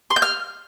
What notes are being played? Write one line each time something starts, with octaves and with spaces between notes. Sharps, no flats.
C6
G6
F6